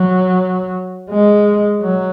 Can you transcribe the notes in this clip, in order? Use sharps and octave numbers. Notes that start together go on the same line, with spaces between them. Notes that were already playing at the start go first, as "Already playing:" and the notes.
Already playing: F#3
G#3
F#3